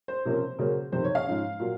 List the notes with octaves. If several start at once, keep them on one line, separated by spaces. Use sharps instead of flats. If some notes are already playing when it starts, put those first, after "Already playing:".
C5
C3 F3 A#3 C#4
C#3 F#3 A#3 C#4
F2 C3 D#3 C5
C#5
F5
G#2 F3 G#3 C#4
A#2 F#3